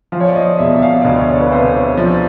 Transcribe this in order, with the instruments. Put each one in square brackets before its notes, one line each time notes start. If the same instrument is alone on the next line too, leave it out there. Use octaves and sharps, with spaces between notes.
[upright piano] F3 [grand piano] F5
[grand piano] C#5
D5
D#5
[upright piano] E1 [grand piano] E5
[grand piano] E5
F5
D5
[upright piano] D2 [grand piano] D#5
[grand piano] C#5
B4
[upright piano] C3 [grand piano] C5
[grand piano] C5
C#5
[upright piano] F3 [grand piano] D5